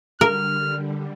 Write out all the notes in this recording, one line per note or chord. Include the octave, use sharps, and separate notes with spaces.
D3 G3 A#4 F6